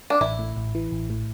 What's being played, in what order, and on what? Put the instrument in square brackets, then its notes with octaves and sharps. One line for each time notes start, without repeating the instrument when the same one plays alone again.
[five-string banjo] D4
[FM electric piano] A1 [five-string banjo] E4
[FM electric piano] A2
A1
E3
A1
A2